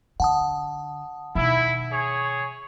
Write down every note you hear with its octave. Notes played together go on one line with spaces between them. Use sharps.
D3 F#5 A5 D#6
B2 D#3 E4
G#4 C#5